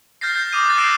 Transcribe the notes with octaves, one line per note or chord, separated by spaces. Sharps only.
F6 G6 A6 A#6 C7
G6
D6 D#6 D#7
D6 F#6 G6 A6
E6 F#6 A#6 C7 D7 E7